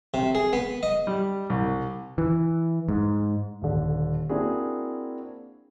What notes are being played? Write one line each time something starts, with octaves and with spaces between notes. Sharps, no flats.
C3
G#4
B3
D#5
G3
C2
E3
G#2
D#1 D3
A#3 C4 D4 E4 F#4 G#4